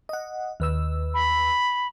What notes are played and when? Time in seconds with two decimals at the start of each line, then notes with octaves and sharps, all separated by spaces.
0.09 D#5 F#5
0.60 D#2 B4 E6
1.14 B5